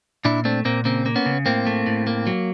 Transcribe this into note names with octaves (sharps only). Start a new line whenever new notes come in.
A#2 D4 E4
A3 C4 D4
A#2 A#3 C4
C#3 A#3 C4
A#3
B3 C#4
C#3
A2 A#3 C4
A3
A2
A#3
F#3